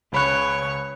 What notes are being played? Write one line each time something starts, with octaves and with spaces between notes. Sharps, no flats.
C#2 C#3 C#5 B5 F#6